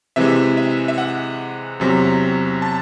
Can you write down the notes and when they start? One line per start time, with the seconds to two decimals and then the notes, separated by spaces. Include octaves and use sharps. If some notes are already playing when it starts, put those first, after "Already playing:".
0.16 C3 E3 G#3 E5
0.57 E5
0.88 E5
0.98 F#5
1.80 E2 C3 F#3
2.62 A5